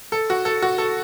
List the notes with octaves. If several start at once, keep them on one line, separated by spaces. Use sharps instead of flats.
A4
F#4
A4
F#4
A4